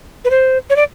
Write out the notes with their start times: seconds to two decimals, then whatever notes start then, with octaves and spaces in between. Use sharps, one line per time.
0.25 B4
0.30 C5
0.70 C#5
0.76 D5